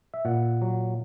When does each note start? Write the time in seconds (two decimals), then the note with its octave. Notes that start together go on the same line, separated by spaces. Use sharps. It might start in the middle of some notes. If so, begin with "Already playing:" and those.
0.14 E5
0.25 A#2 F#5
0.62 F#3